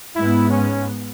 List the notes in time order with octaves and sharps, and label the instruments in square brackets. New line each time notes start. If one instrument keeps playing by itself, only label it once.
[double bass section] G#2 G#3 B3 [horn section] E4
[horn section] C#4